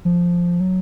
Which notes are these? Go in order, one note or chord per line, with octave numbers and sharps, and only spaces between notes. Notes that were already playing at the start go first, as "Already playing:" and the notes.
F3
F#3